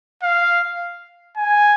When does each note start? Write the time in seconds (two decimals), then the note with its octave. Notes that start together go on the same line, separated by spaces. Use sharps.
0.23 F5
1.37 G#5